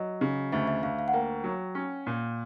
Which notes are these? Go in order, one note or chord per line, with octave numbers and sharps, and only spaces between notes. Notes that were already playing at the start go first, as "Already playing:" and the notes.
Already playing: F#3 D#5
C#3
D2 E5
E5
D2 F5
F5
F#5
A#3 G5
F#3
C#4
A#2